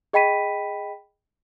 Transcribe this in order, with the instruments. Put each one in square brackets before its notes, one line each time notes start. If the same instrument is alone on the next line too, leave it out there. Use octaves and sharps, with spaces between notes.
[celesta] G#4 D#5 G5 B5 B6 D#7